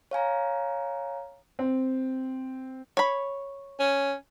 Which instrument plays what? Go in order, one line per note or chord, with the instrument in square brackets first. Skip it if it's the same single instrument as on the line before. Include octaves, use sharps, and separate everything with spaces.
[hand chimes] C#5 F5 G#5 A#5
[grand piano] C4
[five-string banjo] C#5 B5
[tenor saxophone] C#4